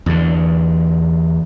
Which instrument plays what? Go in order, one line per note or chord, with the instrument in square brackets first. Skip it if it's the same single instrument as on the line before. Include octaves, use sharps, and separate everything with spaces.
[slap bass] E2 D3